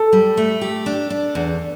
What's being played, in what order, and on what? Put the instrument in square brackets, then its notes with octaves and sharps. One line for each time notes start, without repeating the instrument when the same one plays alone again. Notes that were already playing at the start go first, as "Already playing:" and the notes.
Already playing: [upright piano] A4
[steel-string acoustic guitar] G3
A3
G4
D4
D4
E2